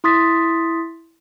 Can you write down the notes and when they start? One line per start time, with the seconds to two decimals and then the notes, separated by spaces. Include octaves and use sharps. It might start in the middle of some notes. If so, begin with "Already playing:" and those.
0.04 E4 C6 D#6 A6 B6